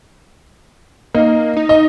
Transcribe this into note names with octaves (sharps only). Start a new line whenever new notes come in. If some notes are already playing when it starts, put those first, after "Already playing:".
A#3 D#4
D#4
D#5